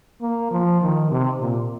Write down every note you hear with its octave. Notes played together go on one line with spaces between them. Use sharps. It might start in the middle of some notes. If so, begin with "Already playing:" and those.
A#3
F3
D#3
C3
A#2